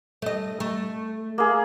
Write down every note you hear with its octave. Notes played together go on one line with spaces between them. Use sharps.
A3 D#5
A3
A#3 G#4